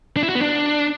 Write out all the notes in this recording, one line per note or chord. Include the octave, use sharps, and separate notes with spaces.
D4
E4
F#4
B3
D4